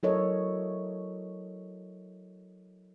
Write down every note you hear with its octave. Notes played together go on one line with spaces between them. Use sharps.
F#3 E4 A4 A#4 C#5 D#5